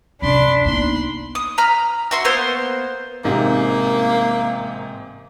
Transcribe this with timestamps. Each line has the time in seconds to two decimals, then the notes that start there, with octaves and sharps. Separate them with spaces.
0.22 F#2 C3 D4 D5 B5 C6
0.65 A#3 B3 D#4 B5 C6
1.35 D#6
1.58 A#5 B5 F6
2.11 F#4 E5 C6
2.25 A#3 B3 C5 C6
3.25 A1 G#2 C3 A#3